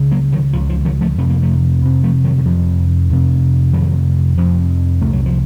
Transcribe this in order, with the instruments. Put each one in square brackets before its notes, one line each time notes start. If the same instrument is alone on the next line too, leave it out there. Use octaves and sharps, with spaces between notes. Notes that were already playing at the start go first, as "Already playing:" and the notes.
Already playing: [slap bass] C#2 C#3
F#3 A#3
D#3 F#3
C#2 C#3 F3
F3
D#3 F#3
F3 A3
F2 C3 A3
A#3
F3 A3
F2 C3
F3 A3
D#3 F#3
D#3
F2 C3 F3
F2 C3
F2 C3 D#3 F#3
F2 C3 F3
C2 A#2 A3
F#3
F3